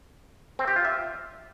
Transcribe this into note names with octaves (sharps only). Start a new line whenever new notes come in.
C4
G4
F4
E5